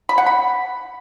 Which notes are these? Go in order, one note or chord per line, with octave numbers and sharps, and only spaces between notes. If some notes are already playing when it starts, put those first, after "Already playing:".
B5
F#5
B5